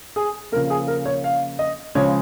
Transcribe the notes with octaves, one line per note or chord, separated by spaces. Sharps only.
G#4
C#3 F3 A#3 A#4
G#4
A#4
C#5
F5
D#5
C#3 F3 G#3 C#5